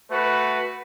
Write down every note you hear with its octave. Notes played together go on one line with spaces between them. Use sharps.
A3 F#4 B4